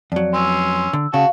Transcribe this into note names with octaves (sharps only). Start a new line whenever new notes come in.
F2 F#3 D5
C#4 C6 E6
D3
C#3 F#4 F5 A5